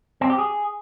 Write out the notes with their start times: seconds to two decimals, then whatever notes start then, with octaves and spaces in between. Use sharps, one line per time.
0.21 C4
0.30 G4
0.39 G#4